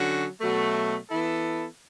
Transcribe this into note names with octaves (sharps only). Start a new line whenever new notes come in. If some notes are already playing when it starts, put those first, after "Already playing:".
Already playing: D3 F#3 C#4 F#4
B2 F#3 A3
E3 B3 E4 A4